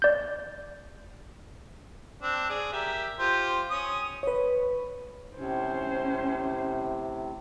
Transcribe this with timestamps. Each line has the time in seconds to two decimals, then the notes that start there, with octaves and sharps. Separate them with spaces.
0.02 D5 G6
2.22 C4 D4
2.49 G#4 D5
2.72 G4 A#4 E5
3.19 F4 G4 C5
3.71 C#4 D#6
4.23 B4 C#5
5.37 A2 C3 C#4 C5